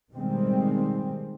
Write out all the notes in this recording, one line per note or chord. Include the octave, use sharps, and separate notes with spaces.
B2 D#3 G3 G#3 C4